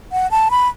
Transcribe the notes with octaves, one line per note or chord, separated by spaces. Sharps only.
F#5
A5
B5